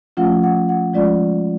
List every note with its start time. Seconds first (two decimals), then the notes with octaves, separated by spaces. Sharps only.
0.17 F3 A3 C#4 F4 F#5
0.43 F#5
0.69 F#5
0.94 F3 G#3 C#4 F4 D5